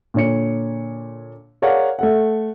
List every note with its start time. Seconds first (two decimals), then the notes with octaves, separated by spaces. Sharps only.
0.14 A#2 D3 C#5 C#7
1.62 G#4 A#4 C#5 D5 F5 F#5
1.99 A3 A4 F#5